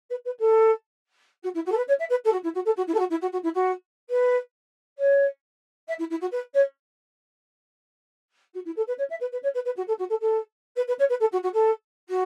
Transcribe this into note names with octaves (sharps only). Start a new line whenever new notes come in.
B4
B4
A4
F#4
E4
F#4
A4
B4
C#5
E5
B4
A4
F#4
E4
F#4
A4
F#4
E4
A4
F#4
E4
F#4
F#4
E4
F#4
B4
C#5
E5
E4
E4
F#4
B4
C#5
F#4
E4
A4
B4
C#5
E5
B4
B4
C#5
B4
B4
F#4
A4
F#4
A4
A4
B4
B4
C#5
B4
A4
F#4
F#4
A4
F#4